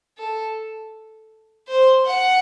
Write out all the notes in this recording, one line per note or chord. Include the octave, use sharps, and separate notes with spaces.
A4
C5
F#5